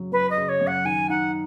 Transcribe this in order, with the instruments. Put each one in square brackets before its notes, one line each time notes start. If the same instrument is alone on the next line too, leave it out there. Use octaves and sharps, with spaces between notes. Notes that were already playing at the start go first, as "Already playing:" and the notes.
Already playing: [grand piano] F#2 C#3 F#3
[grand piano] F#2 [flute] B4
[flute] D#5
[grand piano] C#3
[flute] C#5
[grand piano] F#2
[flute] F#5
[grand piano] D#3 [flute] G#5
[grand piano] D#4 [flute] F#5